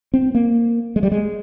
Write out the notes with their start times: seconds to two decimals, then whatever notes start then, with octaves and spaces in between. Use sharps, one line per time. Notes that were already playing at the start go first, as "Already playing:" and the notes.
0.14 C4
0.35 A#3
0.96 G#3
1.03 G3
1.12 G#3